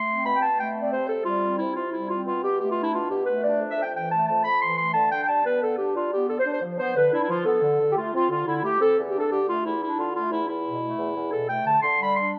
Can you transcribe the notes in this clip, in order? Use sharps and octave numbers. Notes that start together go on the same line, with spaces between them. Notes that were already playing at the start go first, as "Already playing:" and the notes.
Already playing: A3 C6
C4
B2 B5
G5
B2 A5
A3 G5
C4
D5
C3 C5
C3 A4
G3 F4
C4
C3 E4
C3 F4
G3 E4
C4 F4
B2 F4
B2 G4
A3 G4
F4
D4
E4
B2 F4
B2 G4
A3 B4
D4 D5
F2
E5
F2
G5
E3 G5
A3 A5
F2 A5
F2 B5
E3 C6
A3 C6
D3 A5
D4 G5
G5
G3 A5
B3 B4
D3 A4
D4 G4
G3 F4
B3 G4
D3 A4
C5
D4
C5
F3
B3 C5
D3 B4
D4 E4
E4
F3 F4
B3 A4
D3
D3
G4
A3 F4
C4 F4
D3 F4
D3 E4
A3 G4
C4 A4
E2
G4
D4
A4
D3 G4
A3 F4
E2 E4
D4 E4
D3 F4
A3 F4
E2 E4
E2 E4
B2
A3
E2
E2
B2 A4
A3 G5
D3 A5
D3 C6
G3 B5
D4 C6